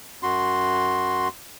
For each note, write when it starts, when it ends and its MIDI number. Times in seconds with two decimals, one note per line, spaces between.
0.23 1.28 42
0.23 1.28 66
0.23 1.28 84